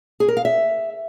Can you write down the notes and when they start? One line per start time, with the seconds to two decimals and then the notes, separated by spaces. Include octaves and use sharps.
0.20 G#4
0.28 A#4
0.37 F5
0.45 E5